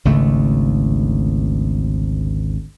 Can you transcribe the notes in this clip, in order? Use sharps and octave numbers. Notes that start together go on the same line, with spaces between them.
G#1 D2 C#3 A3